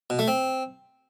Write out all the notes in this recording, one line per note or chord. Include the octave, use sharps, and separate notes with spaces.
B2
A3
C4